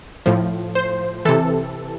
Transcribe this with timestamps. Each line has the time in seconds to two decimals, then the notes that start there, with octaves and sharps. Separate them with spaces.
0.26 A2 F3
0.75 C5
1.25 C3 E3 A4